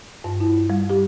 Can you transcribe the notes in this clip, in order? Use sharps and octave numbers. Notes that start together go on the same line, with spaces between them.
G2
E4
G3
G4